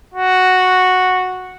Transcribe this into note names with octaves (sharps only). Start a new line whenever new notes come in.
F#4